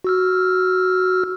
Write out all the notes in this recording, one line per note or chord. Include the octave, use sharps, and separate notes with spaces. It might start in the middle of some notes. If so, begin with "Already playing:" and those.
F#4 E6 F6